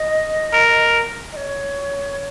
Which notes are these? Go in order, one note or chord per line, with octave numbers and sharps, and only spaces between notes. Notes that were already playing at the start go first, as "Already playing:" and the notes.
Already playing: D#5
A#4
D#5
C#5